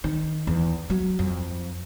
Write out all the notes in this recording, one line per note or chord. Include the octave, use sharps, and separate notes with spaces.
D#3
E2
F#3
F2